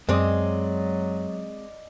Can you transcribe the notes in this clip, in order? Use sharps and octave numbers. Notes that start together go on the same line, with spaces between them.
F#2 F#3 G#3 C4 D5 D#5